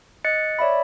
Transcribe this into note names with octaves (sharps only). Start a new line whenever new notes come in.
D#5 F#6 A6 C#7
C#5 D5 E5 B5